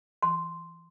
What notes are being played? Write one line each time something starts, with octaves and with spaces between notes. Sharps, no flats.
C6